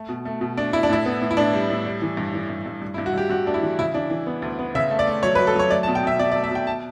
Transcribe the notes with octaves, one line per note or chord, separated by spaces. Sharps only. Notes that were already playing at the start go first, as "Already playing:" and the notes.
Already playing: A3
B2
A3
B2
A3 D4
A3 E4
D4
A2 E4
B3
A2
E4
A2 D4
G3
A2
G3
E3
G2
E3
G2
G2
G2
E4
G2
F#4
G2 G4
G2 F#4
A3 D4
E4
E3
C#3 E4
E3 D4
E3
B3
D2
B3
C#3 E5
A3
D5
A3
F#3 C#5
B4
F#3
A4
F#3 C#5
A3 D5
A5
B2
G5
B2 E5
B2 D5
D5
A3
E5
B2 G5
A5